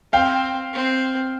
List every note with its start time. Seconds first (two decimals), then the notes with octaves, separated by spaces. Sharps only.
0.13 C4 F5 G5
0.74 C4